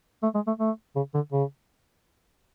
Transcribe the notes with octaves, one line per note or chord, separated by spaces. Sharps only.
A3
G#3
A3
A3
C#3
D3
C#3